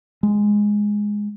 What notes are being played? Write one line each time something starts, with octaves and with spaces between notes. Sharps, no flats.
G#3